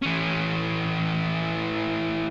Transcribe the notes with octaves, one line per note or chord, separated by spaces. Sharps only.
E3 C#4